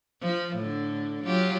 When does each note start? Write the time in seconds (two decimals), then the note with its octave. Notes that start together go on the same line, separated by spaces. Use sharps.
0.21 F3
0.57 A2 D3
1.24 F#3 F4 G4